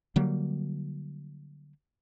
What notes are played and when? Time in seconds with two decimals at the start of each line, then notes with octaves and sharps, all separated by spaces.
0.16 D3 F#3 G3 A#3